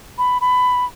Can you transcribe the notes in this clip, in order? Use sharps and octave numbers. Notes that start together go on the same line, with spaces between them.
B5
B5